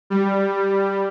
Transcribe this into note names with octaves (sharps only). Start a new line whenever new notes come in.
G3